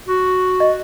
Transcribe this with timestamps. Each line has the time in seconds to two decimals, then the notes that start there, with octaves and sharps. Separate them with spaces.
0.08 F#4
0.60 D#5